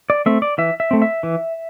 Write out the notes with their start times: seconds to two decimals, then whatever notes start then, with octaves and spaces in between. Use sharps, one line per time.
0.10 D5
0.26 A3 C4 E5
0.42 D5
0.58 E3 E5
0.80 E5
0.91 A3 C4
1.02 E5
1.23 E3